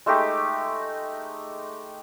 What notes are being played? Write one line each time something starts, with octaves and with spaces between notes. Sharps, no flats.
G#3 A3 D#4 G4